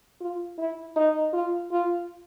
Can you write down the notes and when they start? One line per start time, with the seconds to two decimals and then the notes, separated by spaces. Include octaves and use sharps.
0.20 F4
0.58 E4
0.96 D#4
1.33 F4
1.71 F4